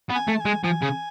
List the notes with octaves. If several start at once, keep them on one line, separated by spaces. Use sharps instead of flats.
B3
G#5
A3
A5
G#5
G#3
F3 G#5
C#3